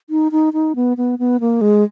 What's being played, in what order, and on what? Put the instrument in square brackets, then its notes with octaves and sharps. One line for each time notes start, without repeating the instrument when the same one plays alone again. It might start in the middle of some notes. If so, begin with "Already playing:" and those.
[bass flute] D#4
D#4
D#4
B3
B3
B3
A#3
G#3